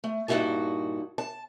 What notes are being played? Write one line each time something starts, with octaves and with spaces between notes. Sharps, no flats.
A3
G2 A#2 D#4 E4 F#4 A5
A5